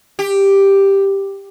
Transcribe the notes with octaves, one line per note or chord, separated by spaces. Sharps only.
G4